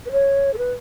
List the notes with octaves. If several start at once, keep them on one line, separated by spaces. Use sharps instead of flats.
B4
C#5
A4
B4